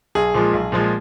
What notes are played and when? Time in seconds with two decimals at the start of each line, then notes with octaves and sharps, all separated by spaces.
0.15 B1 G#4
0.34 A#2 F3 G#3
0.53 B1
0.72 A#2 F3 G#3